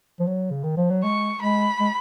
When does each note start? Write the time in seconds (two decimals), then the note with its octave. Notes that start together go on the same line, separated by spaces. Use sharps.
0.20 F3
0.27 F#3
0.51 C#3
0.64 D#3
0.77 F3
0.90 F#3
1.04 G#3 C#6
1.42 G#3 B5
1.80 G#3